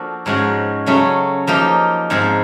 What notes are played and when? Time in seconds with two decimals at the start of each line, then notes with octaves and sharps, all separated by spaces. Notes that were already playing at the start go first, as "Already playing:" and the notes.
Already playing: F3 A#3 D4 F#4 A4
0.26 G#2 F3 G#3 C#4 F#4
0.87 C#3 F#3 A3 C#4
1.47 F3 A#3 D#4 G4
2.10 G#2 F3 G#3 C4